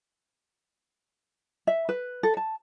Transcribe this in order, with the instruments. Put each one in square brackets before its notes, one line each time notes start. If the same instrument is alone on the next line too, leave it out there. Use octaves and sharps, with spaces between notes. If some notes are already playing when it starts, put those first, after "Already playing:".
[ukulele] E5
B4
A4
A5